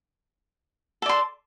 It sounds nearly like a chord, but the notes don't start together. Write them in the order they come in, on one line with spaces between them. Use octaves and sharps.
A4 D5 C6